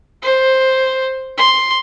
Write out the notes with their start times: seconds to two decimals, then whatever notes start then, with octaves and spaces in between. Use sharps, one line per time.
0.23 C5
1.37 C6